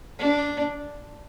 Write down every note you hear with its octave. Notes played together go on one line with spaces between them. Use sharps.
D4